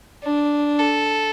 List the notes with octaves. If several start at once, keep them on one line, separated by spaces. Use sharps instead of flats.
D4
A4